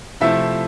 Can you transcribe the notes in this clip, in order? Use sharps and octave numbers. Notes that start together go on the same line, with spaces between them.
C3 F3 A3 E4 E5